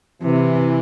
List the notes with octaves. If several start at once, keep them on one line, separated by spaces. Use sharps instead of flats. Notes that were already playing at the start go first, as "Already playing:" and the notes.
C3 E3